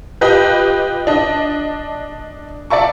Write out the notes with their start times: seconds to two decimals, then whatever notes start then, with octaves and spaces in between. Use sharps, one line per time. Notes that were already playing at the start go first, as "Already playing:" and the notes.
0.21 F4 G4 B4 D#5
1.07 D4 D#5
2.70 D5 E5 A5 C#6